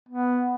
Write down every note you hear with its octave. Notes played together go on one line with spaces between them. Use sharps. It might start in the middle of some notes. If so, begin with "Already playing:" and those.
B3